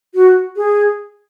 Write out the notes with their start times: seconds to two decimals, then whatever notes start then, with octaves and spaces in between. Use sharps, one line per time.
0.15 F#4
0.56 G#4